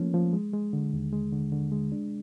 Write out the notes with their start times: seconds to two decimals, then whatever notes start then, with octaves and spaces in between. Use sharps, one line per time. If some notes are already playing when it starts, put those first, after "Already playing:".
Already playing: F3 A3 A#3 C#4
0.14 F3
0.33 G#3
0.53 G#3
0.73 D3
0.93 D#2
1.13 G#3
1.33 D3
1.52 D3
1.72 G#3
1.92 D4